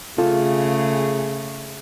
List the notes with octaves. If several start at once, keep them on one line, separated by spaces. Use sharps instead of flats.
C#3 A3 F4 G#4 A4